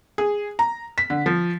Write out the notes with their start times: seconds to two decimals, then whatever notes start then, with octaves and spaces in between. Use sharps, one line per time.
0.18 G#4
0.59 A#5
0.98 B6
1.10 D3
1.26 F3